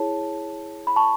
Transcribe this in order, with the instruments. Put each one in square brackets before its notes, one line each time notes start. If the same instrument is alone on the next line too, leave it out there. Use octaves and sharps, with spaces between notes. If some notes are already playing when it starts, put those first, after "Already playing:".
Already playing: [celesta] E4 G#4 C#5 A5
B5
A5 C#6